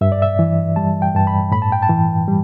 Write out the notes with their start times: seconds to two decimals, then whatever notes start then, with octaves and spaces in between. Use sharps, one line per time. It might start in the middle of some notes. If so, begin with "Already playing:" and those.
0.01 G2 E5
0.12 D5
0.22 E5
0.39 E3
0.76 G3 A5
1.02 G5
1.14 G2 A5
1.27 B5
1.52 A2 B5
1.62 A5
1.72 G5
1.82 A5
1.89 E3
2.28 G3